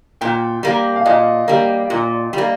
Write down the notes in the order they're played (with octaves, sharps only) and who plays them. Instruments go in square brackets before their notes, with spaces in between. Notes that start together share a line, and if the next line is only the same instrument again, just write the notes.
[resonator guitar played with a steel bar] A#2 [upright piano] G5
[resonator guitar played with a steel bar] G3 A#3
[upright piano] F5
[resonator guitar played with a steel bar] A#2 [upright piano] D#5
[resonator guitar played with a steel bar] G3 A#3
A#2
G3 A#3